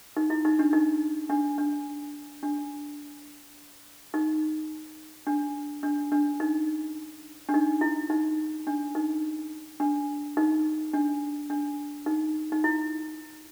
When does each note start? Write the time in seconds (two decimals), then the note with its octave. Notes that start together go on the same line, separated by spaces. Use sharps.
0.17 D#4
0.30 E4
0.45 D#4
0.59 D4
0.73 D#4
1.30 D4
1.58 D4
2.43 D4
4.14 D#4
5.27 D4
5.83 D4
6.12 D4
6.40 D#4
7.49 D4
7.54 D#4
7.81 E4
8.10 D#4
8.67 D4
8.95 D#4
9.80 D4
10.37 D#4
10.93 D4
11.50 D4
12.06 D#4
12.52 D#4
12.64 E4